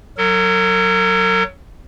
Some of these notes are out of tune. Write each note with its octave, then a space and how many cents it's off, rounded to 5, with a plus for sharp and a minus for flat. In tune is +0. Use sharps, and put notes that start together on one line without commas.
F#3 +0 A#4 -45